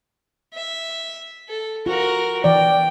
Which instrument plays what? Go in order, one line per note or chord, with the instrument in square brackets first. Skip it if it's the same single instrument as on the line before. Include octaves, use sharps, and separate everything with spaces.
[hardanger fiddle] E5
A4
[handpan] F4 [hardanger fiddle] F#4 A#4
[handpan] E3 D5 [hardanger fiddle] G5